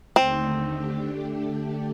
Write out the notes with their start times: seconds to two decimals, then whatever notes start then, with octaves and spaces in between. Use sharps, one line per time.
0.16 D#2 D3 A3 C4 D#4
0.69 D3 A3 D4 G4